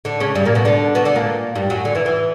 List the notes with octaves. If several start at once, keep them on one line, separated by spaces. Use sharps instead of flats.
D3 D4
C#3 C#4
G2 G3
A#2 A#3
B2 B3
D3 D4
B2 B3
D3 D4
A#2 A#3
G2 G3
F#2 F#3
D3
E2 E3
E2 E3